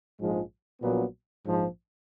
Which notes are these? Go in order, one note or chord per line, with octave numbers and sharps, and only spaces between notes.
A#1 G#2 F3 G#3
A#1 A#2 F#3 B3
A#1 G#2 F3